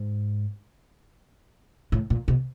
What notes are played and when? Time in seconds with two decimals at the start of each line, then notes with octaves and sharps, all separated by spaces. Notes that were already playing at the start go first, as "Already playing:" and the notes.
Already playing: G#2
1.92 A2
2.10 A#2
2.28 B2